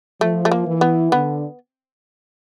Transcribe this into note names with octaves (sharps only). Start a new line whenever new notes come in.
F3 A3
A3
A#3
E3
B3
D3 B3